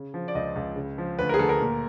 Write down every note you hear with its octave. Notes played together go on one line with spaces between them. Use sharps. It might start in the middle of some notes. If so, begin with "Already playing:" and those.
Already playing: C#3
F3
D5
C#2 D#5
C#2
C#3
F3
D2 B4
A#4
G#4
D2 A4
A#4
A#2